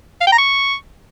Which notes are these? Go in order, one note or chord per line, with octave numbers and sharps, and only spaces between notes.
F5
G5
A#5
C#6